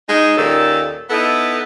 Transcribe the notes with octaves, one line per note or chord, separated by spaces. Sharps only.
G#3 D#4
D#2 A#2 D#3 C#4 A4
B3 D#4 E4 A4